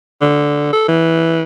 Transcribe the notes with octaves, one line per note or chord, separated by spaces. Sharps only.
D3
A4
E3